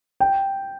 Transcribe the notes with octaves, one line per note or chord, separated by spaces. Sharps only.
G5